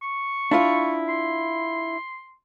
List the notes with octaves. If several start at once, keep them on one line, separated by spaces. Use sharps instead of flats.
C#6
D4 E4 F4
C6